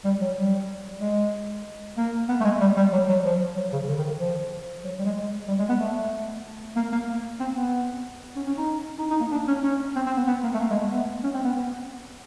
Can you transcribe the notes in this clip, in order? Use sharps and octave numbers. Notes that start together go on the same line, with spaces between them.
G3
F#3
G3
G#3
A#3
B3
A3
G#3
G3
G3
F#3
F#3
F3
F#3
C#3
D3
D#3
F3
F#3
G3
G#3
G#3
G3
G#3
B3
A3
A#3
A#3
C4
B3
C#4
C#4
D#4
D#4
D#4
A#3
D4
C#4
C#4
C4
C4
B3
B3
A#3
A3
A#3
G#3
A3
B3
C#4
C4
B3
B3